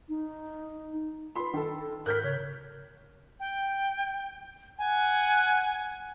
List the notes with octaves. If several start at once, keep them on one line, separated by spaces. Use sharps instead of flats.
D#4
F4 B4 B5 C6
D#3 A4
G#2 A#4 F#6 G6 B6
C#3 C#5
G5
F#5 G#5